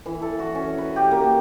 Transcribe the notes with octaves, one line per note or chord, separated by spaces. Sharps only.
E3
A4
F#4
C#4
B4
G4
A#3